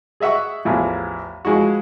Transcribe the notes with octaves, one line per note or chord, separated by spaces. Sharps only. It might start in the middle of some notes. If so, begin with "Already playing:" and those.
G#4 D#5 E5 F#5 C#6
A1 E2 E3 F3
F3 G#3 E4 F#4